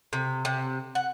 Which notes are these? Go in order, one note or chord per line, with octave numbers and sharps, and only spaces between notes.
C3
C3
F#5